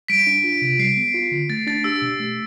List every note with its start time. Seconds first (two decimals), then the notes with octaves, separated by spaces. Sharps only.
0.08 G3 B6 D7
0.27 D4
0.44 F4
0.62 C3
0.79 G3 C7
0.97 B3
1.14 F4
1.32 D3
1.50 A3 A6
1.67 D4 A6
1.84 G4 E6
2.02 B2
2.20 A3